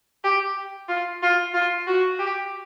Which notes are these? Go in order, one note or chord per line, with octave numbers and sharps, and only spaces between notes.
G4
F4
F4
F4
F#4
G4